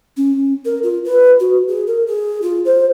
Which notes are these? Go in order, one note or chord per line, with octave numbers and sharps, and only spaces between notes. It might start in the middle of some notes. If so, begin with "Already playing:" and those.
C#4
A#4
F4
B4
F#4
G#4
A#4
G#4
F4
C5